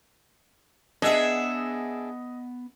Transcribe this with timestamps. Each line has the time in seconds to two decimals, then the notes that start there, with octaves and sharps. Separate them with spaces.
1.02 B3 D4 G#4 D#5 E5 F#5